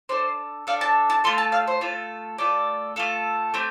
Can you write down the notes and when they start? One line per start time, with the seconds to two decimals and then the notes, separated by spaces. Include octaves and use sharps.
0.09 D4 A4 C5
0.67 D4 A4 F5
0.81 A5
1.10 A5
1.24 A3 F4 A4 C6
1.38 A5
1.52 F5
1.67 C5
1.81 A3 F4 A4
2.38 A3 F4 A4 D5
2.96 A3 F4 A4
3.54 A3 C4 G4